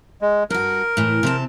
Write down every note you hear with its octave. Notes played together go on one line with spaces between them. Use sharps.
G#3
G2 F#4 A#4
A2 E3
C3 C4 A5